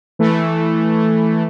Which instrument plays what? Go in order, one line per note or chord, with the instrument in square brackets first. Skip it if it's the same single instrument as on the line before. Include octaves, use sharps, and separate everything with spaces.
[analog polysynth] E3 A3